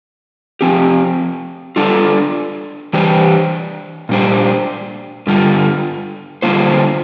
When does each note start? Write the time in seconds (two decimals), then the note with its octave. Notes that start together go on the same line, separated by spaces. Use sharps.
0.61 F3 C4 G4
1.76 G3 D4 F4 A4
2.93 E3 G3 D4 G4 C5
4.09 A#2 G3 D4 G4 C5
5.27 G2 D3 G3 F4
6.42 D3 G3 A#3 F4 C5